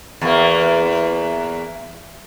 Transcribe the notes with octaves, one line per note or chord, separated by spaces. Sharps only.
E2 A#3